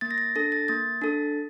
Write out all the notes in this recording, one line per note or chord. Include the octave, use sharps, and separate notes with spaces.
A#3 A6
A#6
A6
D4 A4 A#6
A6
A#3 A6
D4 A4